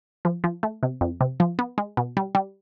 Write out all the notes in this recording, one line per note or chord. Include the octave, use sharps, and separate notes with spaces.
F3
F3
A3
C3
F2
C3
F3
B3
G#3
B2
G3
G3